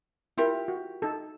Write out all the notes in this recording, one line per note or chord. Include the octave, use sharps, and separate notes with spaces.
E4 F4 G4 A#4
F#4
D#4 A4